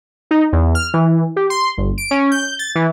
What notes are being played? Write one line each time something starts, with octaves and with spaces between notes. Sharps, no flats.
D#4
E2
F6
E3
G4
C6
G1
D7
C#4
G6
A6
E3